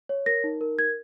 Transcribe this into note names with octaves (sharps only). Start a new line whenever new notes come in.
C#5
A#4 A#6
D#4
A#4
A#4 G#6